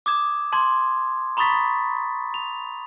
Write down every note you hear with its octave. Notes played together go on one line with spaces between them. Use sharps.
D6 D#6 G#6 E7
A5 C6 D6 G#6
A#5 B5 C#6 D#6 A6 B6
F7